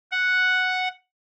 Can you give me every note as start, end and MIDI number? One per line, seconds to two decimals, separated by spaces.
0.12 0.88 78